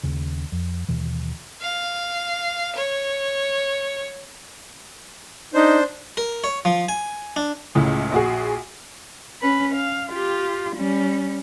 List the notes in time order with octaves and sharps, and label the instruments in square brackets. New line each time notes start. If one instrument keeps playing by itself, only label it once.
[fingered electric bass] D#2 C#3
F2
D#2 B2 E3
[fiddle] F5
C#5
[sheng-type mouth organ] D4 C5 [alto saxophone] D#4
[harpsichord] A#4
C#5
F3
G#5
D4
[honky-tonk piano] C#2 A2 C#3
A#1 F#4 G#4
[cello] C#4 B4
F5
F4 G4
G3 C#4